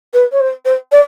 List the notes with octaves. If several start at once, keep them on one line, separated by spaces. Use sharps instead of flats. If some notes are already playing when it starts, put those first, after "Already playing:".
B4
C#5
C5
C5
D5